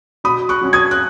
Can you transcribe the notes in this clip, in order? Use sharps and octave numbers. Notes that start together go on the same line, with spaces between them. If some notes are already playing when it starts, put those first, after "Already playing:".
B2 B5 D#6
C#6 F#6
F#3 C#4
D#6 G#6
F#6